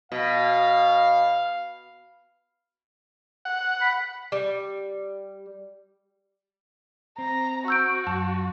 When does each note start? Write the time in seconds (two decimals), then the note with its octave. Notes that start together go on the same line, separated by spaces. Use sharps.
0.12 B2 F5
3.45 F#5
3.82 B5
4.32 G3
7.18 C4 A#5
7.68 F#4 E6 G6 D7
8.07 F#2 A5